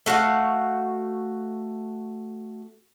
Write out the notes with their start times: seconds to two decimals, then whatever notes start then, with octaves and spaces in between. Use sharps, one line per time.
0.06 A3 F#4 F5 F#5